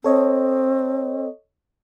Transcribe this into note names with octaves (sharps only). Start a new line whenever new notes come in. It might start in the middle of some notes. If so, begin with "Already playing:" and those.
C4 A4 C#5 D#5